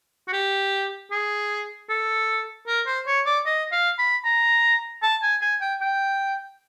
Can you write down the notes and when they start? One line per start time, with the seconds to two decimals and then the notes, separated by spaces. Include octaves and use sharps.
0.28 F#4
0.33 G4
1.11 G#4
1.89 A4
2.67 A#4
2.87 C5
3.07 C#5
3.26 D5
3.46 D#5
3.72 F5
3.98 B5
4.25 A#5
5.02 A5
5.22 G#5
5.41 G#5
5.61 G5
5.81 G5